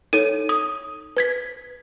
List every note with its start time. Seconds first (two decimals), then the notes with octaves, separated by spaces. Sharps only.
0.13 D#4 A4 C#5 D#7
0.49 D#6
1.17 B4 G#6 B6